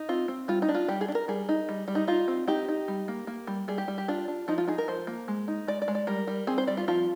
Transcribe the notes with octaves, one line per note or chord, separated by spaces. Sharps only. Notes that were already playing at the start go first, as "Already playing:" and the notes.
Already playing: D#4
C4 F4
C4
G3 F4
D#4
D4
F4
G3 G4
G#4
D4
A#4
G3 G#4
D#4
G3
G3
D#4
D#4 F4
C4
D#4 G4
D#4
G3
A#3
A#3
G3
G3 G#4
G4
G3
G4
D4 F4
D4
F3 D#4
F4
D#4 G#4
A#4
F3 C5
A#3
G#3
D#4
G#3 D5
D5
G#3
D5
G3 A#4
G3
C4 G#4
C5
G3 D5
F4
F3 F4